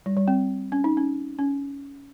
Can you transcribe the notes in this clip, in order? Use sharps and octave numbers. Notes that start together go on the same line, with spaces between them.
G3
G3
C4
C#4
D#4
C#4
C#4